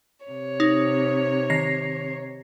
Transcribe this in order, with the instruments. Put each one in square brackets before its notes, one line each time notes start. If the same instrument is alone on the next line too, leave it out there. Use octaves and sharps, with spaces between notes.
[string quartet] C3 C#5
[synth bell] D#4
D#3 A#6 C7